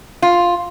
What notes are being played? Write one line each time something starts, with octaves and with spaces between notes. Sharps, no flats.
F4